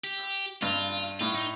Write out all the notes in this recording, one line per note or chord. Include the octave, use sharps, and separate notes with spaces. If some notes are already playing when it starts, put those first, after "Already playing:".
G4
G2 F4
A2 F4
D#4